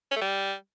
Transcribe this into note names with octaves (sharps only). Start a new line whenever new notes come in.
C#4
A3
G3